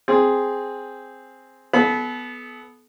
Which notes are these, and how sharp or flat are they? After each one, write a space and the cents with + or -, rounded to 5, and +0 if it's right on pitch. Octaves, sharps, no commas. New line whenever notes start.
C4 +0 G#4 +0
B3 +0 A4 -35 B5 +0